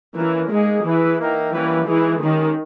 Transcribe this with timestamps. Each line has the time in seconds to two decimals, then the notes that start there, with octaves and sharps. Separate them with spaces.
0.15 E3 A#3 C#4 E4 A#4
0.50 G#3 A#3 D#4 G#4 D#5
0.84 E3 E4 G#4 B4 E5
1.18 A#3 D#4 A#4 E5 G5
1.53 E3 G3 A#3 C#4 G4 B4
1.87 E3 G#3 D#4 G#4
2.21 D#3 G#3 C#4 G4